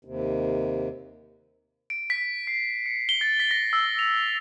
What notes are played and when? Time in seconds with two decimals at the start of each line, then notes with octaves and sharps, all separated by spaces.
0.05 D#2 C3
1.90 D7
2.10 B6
2.47 C7
2.86 C#7
3.09 G7
3.21 A6
3.40 B6
3.51 A#6
3.73 E6
3.99 F7